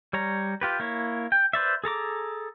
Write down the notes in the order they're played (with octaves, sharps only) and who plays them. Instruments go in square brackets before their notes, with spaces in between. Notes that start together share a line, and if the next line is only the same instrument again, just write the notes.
[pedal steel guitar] G3 C#5 A#5
F4 G4 B4
A#3 E4 C#5
G5
B4 C5 D5 E5
G#4 A4 A#5 D6